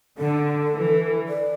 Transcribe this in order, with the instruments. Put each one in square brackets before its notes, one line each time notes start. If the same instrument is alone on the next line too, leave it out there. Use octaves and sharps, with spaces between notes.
[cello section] D3 [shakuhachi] A4
[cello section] E3
[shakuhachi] D5